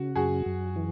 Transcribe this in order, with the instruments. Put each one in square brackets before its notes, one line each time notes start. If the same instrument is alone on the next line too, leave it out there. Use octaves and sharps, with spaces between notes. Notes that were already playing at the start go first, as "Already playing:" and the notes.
Already playing: [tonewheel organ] C#3 [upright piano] F#4
[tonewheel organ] F#2 [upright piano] F#4 G#4
[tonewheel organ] F#2
E3